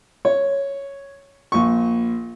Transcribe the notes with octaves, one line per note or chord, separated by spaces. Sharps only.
C#5
A#1 C#6